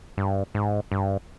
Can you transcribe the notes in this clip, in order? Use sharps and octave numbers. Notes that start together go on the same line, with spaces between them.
G2
G#2
G2